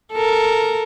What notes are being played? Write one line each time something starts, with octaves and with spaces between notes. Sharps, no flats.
A4 A#4